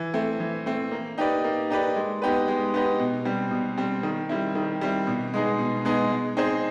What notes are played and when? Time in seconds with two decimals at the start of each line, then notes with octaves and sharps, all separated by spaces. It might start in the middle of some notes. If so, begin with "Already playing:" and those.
Already playing: E3
0.14 A3 C4
0.40 E3
0.66 A3 C4
0.92 A#3
1.18 D#4 G4 B4 D5
1.44 A#3
1.70 D#4 G4 B4 D5
1.96 G#3
2.22 B3 D#4 G4 B4
2.48 G#3
2.74 B3 D#4 G4 B4
3.00 B2
3.25 G3 C4
3.51 B2
3.78 G3 C4
4.03 D#3
4.29 G3 C4 E4
4.55 D#3
4.81 G3 C4 E4
5.07 B2
5.34 G#3 B3 D#4 G#4
5.59 B2
5.85 G#3 B3 D#4 G#4
6.12 G#3
6.37 C4 D#4 G#4 C5